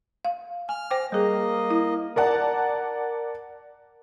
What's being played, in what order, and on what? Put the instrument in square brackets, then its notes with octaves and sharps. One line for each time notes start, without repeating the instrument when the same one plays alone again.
[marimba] F5
[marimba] G#5 [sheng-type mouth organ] F6
[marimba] C5 G5 D6
[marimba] G3 G#4 [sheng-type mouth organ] A#3 D#5
[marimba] E4
[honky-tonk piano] A#4 D5 F#5 A5